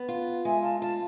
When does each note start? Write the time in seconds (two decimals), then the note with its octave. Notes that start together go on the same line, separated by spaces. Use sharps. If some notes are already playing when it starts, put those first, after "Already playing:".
Already playing: B3
0.08 F4
0.45 G#3 E5 G#5
0.63 F5 A5
0.81 F4 F5 A5